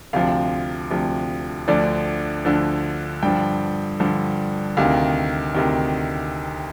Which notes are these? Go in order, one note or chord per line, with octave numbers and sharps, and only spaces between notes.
D2 C3 F3 F5
D2 C3 F3
D2 D3 F3 D5
D2 D3 F3
G2 D3 F3 G5
G2 D3 F3
D2 C3 D#3 F5
D2 C3 D#3